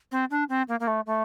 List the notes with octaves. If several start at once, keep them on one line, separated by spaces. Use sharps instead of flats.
C4
D4
C4
A#3
A#3
A3
A3